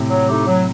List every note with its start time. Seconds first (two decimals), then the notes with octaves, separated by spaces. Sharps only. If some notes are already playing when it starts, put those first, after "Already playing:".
Already playing: A2 C3
0.09 F#3
0.27 A3 D#4 G4
0.46 F#3